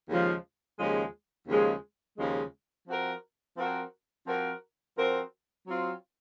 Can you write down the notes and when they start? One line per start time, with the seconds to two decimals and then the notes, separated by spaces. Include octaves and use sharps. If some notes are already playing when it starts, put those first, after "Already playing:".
0.09 D#2 C#3 F3 G#3
0.78 D#2 C#3 F3 G#3
1.48 D#2 C#3 F3 G#3
2.18 D#2 C#3 F3 G#3
2.87 F3 C4 F#4 A#4
3.57 F3 C4 F#4 A#4
4.27 F3 C4 F#4 A#4
4.96 F3 C4 F#4 A#4
5.66 F#3 C4 F4